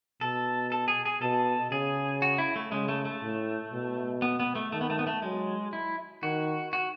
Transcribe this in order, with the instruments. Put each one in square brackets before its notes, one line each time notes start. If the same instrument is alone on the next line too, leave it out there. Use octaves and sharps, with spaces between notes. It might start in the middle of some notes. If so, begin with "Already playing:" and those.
[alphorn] B2 [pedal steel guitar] A4
[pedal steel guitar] A4
G#4
G#4
[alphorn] B2 [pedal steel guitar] A4
[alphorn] C#3 [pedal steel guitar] G#4
[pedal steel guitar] F#4
E4
A3
[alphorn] C#3 [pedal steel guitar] G#3
[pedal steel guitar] A3
A3
[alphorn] A2
B2
[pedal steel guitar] B3
B3
A3
[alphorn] D#3 [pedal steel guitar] A3
[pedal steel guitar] B3
A3
B3
A3
[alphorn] F#3 [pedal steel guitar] G#3
[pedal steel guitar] E4
[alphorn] D#3 [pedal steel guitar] F#4
[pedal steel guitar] F#4